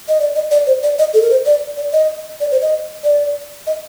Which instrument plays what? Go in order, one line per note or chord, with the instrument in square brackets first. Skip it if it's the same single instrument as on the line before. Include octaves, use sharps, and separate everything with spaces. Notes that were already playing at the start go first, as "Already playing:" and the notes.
[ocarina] D#5
D5
D#5
D5
C5
D5
D#5
A4
A#4
C5
D5
D5
D#5
D5
C5
D#5
D5
D#5